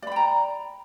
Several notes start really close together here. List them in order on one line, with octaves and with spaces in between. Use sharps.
D5 B5 G5 A#5